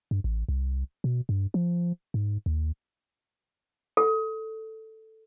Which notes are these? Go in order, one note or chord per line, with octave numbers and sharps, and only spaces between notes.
G2
A1
C2
B2
G2
F3
G#2
D#2
A4